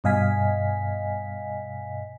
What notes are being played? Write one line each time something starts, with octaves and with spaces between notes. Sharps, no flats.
G2 B2 D#5 F5 G#5 B6